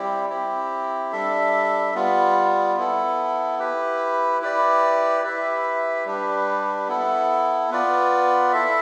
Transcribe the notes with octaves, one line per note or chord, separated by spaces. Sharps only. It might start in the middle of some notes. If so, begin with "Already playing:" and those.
Already playing: G3 C4 E4 G4
C4 E4 G4
G3 D4 A4 E5
G3 B3 F4
B3 E4 A4
E4 G4 B4
E4 G4 B4 D5
E4 G4 B4 E5
G3 D4 G4 B4
B3 E4 A4
B3 F4 B4 D5
E4 A4 E5